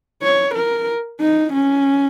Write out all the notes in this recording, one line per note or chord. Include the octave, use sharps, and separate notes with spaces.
C#5
A#4
D#4
C#4